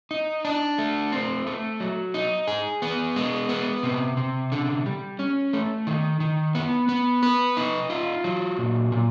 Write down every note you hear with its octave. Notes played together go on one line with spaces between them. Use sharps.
D#4
D4
A3
C4
A3
F#3
D#4
G#4
B3
G#3
B3
C3
C3
D3
G3
C#4
A3
D#3
D#3
B3
B3
B4
D#4
F4
F#3
A#2
A#2